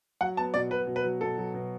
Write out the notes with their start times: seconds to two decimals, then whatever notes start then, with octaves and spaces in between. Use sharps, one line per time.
0.21 F#3 F#5
0.37 B3 A5
0.54 B2 D5
0.71 B2 B4
0.87 B2
0.96 B4
1.04 F#3
1.21 B2 A4
1.38 F#3
1.54 B2